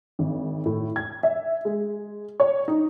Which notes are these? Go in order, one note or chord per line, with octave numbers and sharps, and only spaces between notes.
G#1
A2
G#6
E5
G#3
C#5
D#4